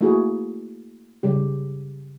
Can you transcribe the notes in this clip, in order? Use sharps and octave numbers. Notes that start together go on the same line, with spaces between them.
A3 A#3 E4 F#4 G#4
C#3 G3 G4